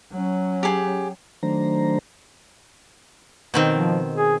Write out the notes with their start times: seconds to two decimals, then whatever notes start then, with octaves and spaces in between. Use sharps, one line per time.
0.12 F#3 C#4
0.63 G4 G#4
1.43 D#3 F#3 A3 D4 C5 A#5
3.54 B2 D#3 C4
3.73 F3
4.14 G#4